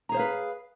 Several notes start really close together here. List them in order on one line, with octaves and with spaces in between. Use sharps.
A#5 G#4 C5 F5 B4